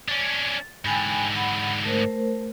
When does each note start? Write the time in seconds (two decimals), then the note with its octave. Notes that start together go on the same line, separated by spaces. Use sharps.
0.09 C#4 D4
0.85 G#2 D3 G5 G#5 B5
1.36 F#5 B5
1.84 A3 A#4 C5